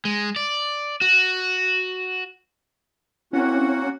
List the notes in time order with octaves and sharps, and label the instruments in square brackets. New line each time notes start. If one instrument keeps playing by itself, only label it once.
[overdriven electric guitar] G#3
D5
F#4
[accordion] A#3 F#4 F#5 [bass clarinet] C4 [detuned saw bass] C#4 [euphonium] E4